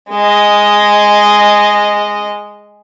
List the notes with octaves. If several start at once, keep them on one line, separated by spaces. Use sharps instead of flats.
G#3 D#5